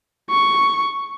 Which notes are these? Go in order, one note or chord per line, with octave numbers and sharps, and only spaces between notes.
C#6